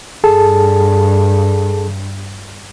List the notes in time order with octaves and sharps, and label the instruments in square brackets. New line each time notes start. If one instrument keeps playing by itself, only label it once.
[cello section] G2 [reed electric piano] G#4 A4 A5